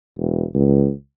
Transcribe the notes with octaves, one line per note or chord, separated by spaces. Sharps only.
E1
C#2